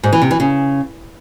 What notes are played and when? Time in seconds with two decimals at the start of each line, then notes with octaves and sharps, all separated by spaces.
0.03 G#2
0.13 E3
0.22 C3
0.31 E3
0.40 C#3